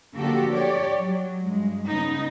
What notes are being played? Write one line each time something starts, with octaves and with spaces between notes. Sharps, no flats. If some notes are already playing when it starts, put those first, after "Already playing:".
D3 F3 A#3 F#4 G4 A4
G4 C#5 D5
F#3
G2 G#3
C#3 B3 D#4